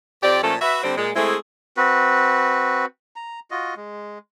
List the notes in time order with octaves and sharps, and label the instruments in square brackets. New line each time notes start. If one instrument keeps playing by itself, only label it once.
[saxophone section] F2 C4 G4 D5
A#2 F3 A3 C#4 A4
F#4 B4 E5
D3 G3 C4
A#2 G#3
G#3 A3 C4 E4 G#4
[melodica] C4 F#4 B4
A#5
F4 F#4 D#5
G#3